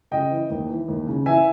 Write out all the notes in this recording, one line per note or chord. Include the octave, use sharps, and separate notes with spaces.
C#3 D#5 G5
E3
D#2
E3
D#2
C#3
E3 E5 G#5